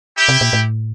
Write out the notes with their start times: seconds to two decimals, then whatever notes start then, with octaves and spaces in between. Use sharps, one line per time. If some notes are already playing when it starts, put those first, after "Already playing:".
0.16 E4 G4
0.28 C3
0.41 A#2
0.53 A2